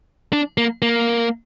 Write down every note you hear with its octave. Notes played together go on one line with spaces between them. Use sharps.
D4
A#3
A#3